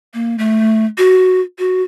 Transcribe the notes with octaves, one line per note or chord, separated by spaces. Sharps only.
A#3
A3
F#4
F#4